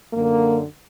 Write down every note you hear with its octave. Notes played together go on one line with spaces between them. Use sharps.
F#2 D3 A#3